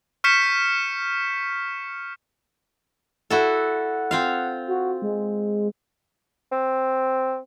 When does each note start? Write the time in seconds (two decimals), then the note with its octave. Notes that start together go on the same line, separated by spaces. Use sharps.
0.24 C#6 F6 G6 B6 C#7 E7
3.30 E4 F#4 A4 F#5
4.11 C4 F4 F5
4.68 F#4
5.02 G#3
6.52 C4